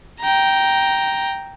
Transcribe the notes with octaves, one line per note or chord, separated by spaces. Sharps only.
G5 A#5